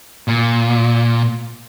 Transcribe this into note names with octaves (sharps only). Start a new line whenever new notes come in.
A#2